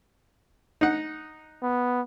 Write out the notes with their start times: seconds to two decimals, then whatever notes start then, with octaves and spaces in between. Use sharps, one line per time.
0.81 D#4 F#5
1.62 B3